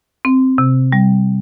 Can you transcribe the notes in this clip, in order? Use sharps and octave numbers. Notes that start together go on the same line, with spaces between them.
C4
C3
G3